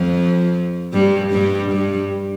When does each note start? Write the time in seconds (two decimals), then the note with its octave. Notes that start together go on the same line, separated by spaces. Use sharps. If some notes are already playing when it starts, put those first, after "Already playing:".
Already playing: F2 F3
0.93 G2 G3
1.32 G2 G3
1.71 G2 G3